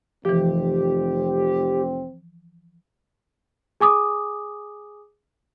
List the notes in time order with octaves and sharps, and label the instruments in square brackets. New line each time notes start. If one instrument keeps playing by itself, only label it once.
[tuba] F1 [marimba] E3 F3 [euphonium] C4 [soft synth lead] G4
[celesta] G#4 G#5 D6 D#6